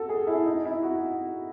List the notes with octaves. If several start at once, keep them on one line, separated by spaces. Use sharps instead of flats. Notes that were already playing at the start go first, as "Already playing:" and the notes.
Already playing: F#4 A4
G#4
E4
D#4
E4
F#4